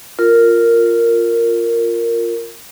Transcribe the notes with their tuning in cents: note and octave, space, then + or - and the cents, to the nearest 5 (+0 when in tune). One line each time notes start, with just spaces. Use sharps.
F4 +0 A#4 -10